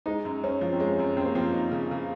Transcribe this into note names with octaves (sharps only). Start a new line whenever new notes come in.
G#3 D#4
F#2
F#2 C#4
F3
C4
G#3 C#4
F#2
F#2 C4
A#3
F3 C4
D#4
C#3
C#3